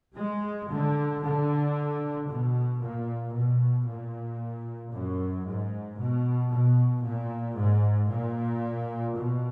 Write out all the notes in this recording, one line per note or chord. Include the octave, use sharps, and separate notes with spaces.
G#3
D3
D3
B2
A#2
B2
A#2
F#2
G#2
B2
B2
A#2
G#2
A#2
B2